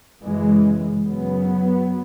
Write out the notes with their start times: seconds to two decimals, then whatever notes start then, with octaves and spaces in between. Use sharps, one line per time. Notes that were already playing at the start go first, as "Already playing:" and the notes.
0.23 F#2 C#3 E3 G#3
1.06 F#2 C#3 F#3 B3